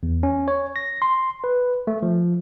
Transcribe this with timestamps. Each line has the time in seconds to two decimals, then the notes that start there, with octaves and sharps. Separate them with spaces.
0.03 E2
0.23 C#4
0.48 C#5
0.76 A#6
1.02 C6
1.44 B4
1.87 A3
2.03 F3